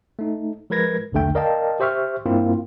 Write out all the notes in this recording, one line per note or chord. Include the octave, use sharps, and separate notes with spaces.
A3 D#4
F3 G#3 A#4 B4 G#6 A#6
B1 E2 D3 A3 G5
A#4 D5 D#5 F5 G5 A5
G4 C5 E5 C#6 F6
G2 A#3 C4 E4 F4